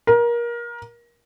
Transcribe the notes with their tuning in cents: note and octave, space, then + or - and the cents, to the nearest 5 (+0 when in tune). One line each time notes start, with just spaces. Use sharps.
A#4 +25